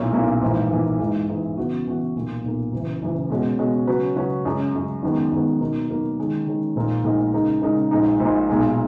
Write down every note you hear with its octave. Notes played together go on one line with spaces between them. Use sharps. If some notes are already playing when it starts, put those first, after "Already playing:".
Already playing: B1 A#2 A#3 C#4 E4
B1 A#2 A#3 C#4 E4
A#1 G#2 E3 A#3
A#1 G#2 E3 A#3
G#2 E3 G#3
G#2 E3 G#3
C#3 E3 B3 F#4
C#3 E3 B3 F#4
B1 A#2 A#3
B1 A#2 A#3
F#1 F#2 E3
F#1 F#2 E3
B2 G#3 C#4 F#4
B2 G#3 C#4 F#4
C#3 F#3 C#4 F#4 B4
C#3 F#3 C#4 F#4 B4
F#2 C#3 G#3
F#2 C#3 G#3
F#2 D#3 G#3 B3
F#2 D#3 G#3 B3
B2 F#3 A#3 D#4 A#4
B2 F#3 A#3 D#4 A#4
D#3 G#3 C#4
D#3 G#3 C#4
A#1 A#2 G#3 D#4 A#4
A#1 A#2 G#3 D#4 A#4
C#3 G#3 D#4 A#4
C#3 G#3 D#4 A#4
A#1 A#2 G#3 D#4
A#1 A#2 G#3 D#4
B1 A#2 G#3 D#4 G#4